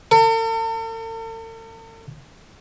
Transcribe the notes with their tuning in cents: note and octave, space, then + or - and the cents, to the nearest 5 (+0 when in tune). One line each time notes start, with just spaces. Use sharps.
A4 +45